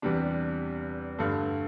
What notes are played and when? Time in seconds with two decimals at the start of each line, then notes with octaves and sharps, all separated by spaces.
0.02 E2 C3 G3 D4
1.19 G2 D3 A3